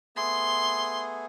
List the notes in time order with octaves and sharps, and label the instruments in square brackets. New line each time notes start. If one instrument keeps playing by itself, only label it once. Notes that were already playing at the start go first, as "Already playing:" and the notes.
[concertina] A3 B3 G#4 [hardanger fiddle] C6